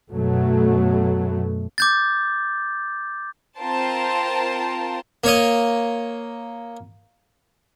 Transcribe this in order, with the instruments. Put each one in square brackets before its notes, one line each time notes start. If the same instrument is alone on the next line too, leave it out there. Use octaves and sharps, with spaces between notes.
[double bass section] F#2 B2 F#3 A3
[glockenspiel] D6 G6 A6
[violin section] C4 F4 A#4 C5 A5
[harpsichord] A#3 C#5 D#5